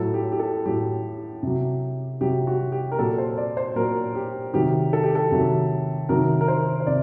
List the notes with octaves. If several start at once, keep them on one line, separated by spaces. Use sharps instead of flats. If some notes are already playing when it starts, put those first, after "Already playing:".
Already playing: A2 F#3 A4
G4
G4
A4
A2 F#3 G4
C3 F#3
C3 F#3 G4
F#4
G4
A#4
A#2 F#3 A4
C5
D5
C5
A#2 F#3 A#4
G4
C3 D#3 F#3 G4
A4
G4
A4
C3 D#3 F#3
C3 D#3 F#3 A#4
A#4
C5
C5
C3 D5